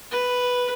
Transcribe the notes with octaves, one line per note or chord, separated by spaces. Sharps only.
B4